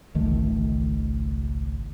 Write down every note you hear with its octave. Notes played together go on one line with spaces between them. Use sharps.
G#1 C#2 D#3 A3